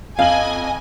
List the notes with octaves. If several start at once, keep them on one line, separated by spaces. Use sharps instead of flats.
F2 D#5 F5 G#5 F#7